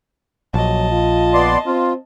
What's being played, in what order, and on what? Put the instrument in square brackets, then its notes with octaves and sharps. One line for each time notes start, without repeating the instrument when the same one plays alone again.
[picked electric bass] A#1 [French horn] F#3 [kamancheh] D#5 A5
[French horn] F4
[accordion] B3 D5 C6
[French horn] C4 [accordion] F4